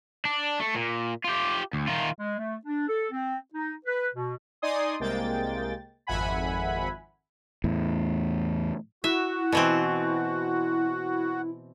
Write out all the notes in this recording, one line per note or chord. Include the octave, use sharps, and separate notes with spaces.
D4
A3
A#2
F4 G4
D2
D#3 F4
G#3
A3
D4
A4
C4
D#4
B4
B2
D#4 D5 G#5 C6 D#6
C2 C3 G#3 A#3 G5 A6
G#1 F2 E5 F#5 G#5 B5
E2 A2
E4 F#4 E5
B2 E3 C4